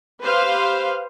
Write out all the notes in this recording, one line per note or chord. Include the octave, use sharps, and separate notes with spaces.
G4 B4 C5 F5